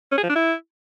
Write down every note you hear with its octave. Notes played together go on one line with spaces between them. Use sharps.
C#4
G#4
F3
D4
E4